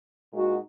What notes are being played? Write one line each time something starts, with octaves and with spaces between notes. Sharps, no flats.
A#2 G#3 D#4 F#4